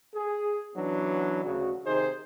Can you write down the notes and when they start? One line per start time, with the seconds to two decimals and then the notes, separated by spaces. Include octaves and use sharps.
0.15 G#4
0.76 E3 F#3 B3 C#4 D4
1.45 D2 C#3 F#4
1.86 C3 D#3 D#4 G#4 C5